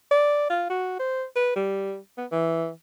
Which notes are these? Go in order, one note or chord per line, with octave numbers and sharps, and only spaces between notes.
D5
F4
F#4
C5
B4
G3
B3
E3